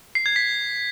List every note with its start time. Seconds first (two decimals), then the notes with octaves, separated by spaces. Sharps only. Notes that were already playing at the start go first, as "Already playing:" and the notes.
0.15 C7
0.26 G#6
0.36 B6